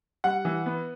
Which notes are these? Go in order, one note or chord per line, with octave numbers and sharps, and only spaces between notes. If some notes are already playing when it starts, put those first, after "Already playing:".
G3 F#5
E3
B3